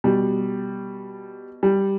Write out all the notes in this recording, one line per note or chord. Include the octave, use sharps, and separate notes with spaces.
B2 G3
G3